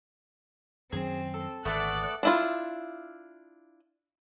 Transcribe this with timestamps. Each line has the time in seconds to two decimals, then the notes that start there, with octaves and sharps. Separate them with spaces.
0.92 F#2 D#3 F#3 C4 G#4
1.34 A4
1.65 G#1 D3 A3 B3 A4 D5 F#5 F#6
2.23 D4 E4 F4